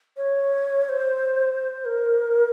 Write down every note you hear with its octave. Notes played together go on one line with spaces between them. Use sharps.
C#5
C5
A#4